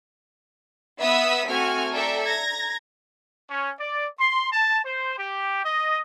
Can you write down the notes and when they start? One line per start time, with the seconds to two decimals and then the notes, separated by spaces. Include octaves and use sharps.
0.99 B3 E5 B5 D#6 E6 B6
1.47 A3 C4 F#4 G#5 F6
1.93 A4 D5 E5 G5 A#5
2.23 A#5 G#6 A#6
3.50 C#4
3.79 D5
4.19 C6
4.52 A5
4.84 C5
5.18 G4
5.64 D#5